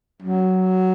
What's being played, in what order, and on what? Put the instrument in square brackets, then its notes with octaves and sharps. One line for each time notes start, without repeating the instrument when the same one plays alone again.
[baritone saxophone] F#3